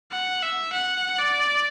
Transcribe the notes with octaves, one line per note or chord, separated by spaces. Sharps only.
F#5
E5
F#5
D5